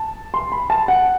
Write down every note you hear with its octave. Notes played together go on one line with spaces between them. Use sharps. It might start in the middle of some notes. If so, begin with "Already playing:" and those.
Already playing: A5
C6
B5
A5
F#5